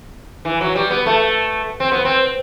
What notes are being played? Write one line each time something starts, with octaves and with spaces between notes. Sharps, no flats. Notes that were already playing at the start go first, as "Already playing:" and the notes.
E3
F#3
G3
B3
A3
C4
B3
C4